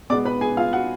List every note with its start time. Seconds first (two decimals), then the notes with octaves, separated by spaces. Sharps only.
0.10 B2 G#3 B3 D5 D6
0.25 B4 B5
0.41 G#4 G#5
0.57 F4 F5
0.73 F#4 F#5